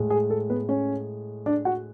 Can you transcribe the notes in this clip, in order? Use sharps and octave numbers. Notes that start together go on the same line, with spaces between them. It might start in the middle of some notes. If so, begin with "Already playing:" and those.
Already playing: A2 G#3
G#4
A4
B3 B4
C#4 C#5
D4 D5
F#4 F#5